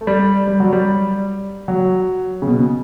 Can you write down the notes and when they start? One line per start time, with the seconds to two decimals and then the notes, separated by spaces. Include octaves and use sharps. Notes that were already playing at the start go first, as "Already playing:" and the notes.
0.01 A3
0.07 G3
0.47 G3
0.60 F#3
0.73 G3
1.68 F#3
2.42 C#3
2.47 B2